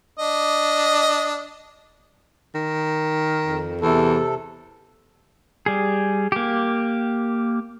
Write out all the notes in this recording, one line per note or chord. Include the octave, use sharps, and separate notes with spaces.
D4 D#5
D#3
F2
E2 C3 A4
G3 G#4
A#3 G4